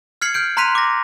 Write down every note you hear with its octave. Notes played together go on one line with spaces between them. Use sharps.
F6 G#6 C7 C#7 F#7
F6 G6 D7
A#5 C6 F#6 B6 D#7 F7
D6 A#6